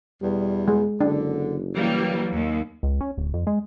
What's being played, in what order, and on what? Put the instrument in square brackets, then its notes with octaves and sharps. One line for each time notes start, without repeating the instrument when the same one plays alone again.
[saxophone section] E2 B2 [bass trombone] G3
[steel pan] G#3
[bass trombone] F#1 [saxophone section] D3 [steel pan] D4
[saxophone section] E3 [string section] F#3 G3 A#3
[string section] D#2
[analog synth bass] C#2
C#4
D1
F2
G#3